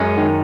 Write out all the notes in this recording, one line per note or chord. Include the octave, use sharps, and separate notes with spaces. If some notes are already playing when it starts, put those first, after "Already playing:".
Already playing: F#2 G#3 C#4
D#3